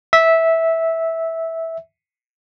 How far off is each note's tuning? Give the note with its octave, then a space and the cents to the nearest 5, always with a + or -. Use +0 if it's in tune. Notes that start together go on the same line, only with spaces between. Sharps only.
E5 -10